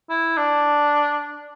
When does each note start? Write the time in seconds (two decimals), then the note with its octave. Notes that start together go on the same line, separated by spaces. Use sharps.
0.10 E4
0.37 D4